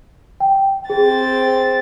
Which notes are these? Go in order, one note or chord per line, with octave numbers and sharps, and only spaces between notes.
G5
C4 G#4 A6